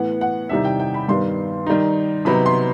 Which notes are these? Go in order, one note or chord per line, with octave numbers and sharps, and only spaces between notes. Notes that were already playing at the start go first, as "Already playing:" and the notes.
Already playing: A2 E3 B3 F#5
F#5
E2 C3 D#3 G3 D#4 E5
G5
G5
B5
G2 D#3 G3 B3 C6
D#3 G3 D#4
C3 F#3 B3 D#4 B5
C6